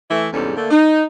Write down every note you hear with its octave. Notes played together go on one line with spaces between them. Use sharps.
E3 A3 E5
E2 G#2 C3 G3 C#4 A4
D3 A3 A#3
D#4